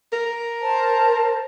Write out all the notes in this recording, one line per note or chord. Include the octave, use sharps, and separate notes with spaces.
A#4
C5 A5